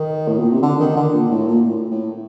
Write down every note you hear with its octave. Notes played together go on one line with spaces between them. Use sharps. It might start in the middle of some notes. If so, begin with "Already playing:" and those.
Already playing: D#3
A2
A#2
C3
D3
D#3
D3
A#2
A2
A#2
A2
A2